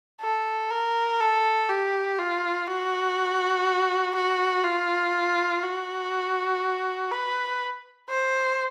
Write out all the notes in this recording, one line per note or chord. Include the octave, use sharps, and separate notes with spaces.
A4
A#4
A4
G4
F4
F#4
F#4
F4
F#4
B4
C5